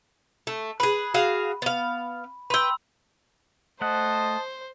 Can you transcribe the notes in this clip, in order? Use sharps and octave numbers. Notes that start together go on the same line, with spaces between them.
A3
G#4 B4 B5
F#4 G#4 F5
B3 F5
B4 G5 B5 C6 E6
A3 C5 D#5 F#5 A5